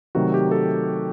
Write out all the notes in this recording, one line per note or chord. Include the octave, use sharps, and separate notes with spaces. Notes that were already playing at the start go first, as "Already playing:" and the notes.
C3 D#3 F#3 A3 F#4
G4
A4